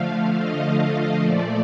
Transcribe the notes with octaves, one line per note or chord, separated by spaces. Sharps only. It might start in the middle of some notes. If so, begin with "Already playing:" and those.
Already playing: D3 F3 A3 F5
D#5
A#2 F3 A3 D5